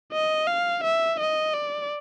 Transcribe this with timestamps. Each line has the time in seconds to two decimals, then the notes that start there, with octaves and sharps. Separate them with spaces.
0.12 D#5
0.47 F5
0.84 E5
1.20 D#5
1.54 D5